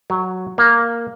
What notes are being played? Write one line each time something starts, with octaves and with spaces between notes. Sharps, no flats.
F#3
A#3